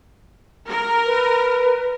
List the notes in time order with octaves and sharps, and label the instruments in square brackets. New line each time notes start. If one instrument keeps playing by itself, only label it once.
[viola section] A#4
[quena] B4